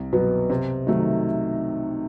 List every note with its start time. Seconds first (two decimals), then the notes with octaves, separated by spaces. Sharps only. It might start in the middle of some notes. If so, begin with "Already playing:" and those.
Already playing: C2
0.13 B2 F#3 B3
0.50 C3
0.87 D#3 F#3 A3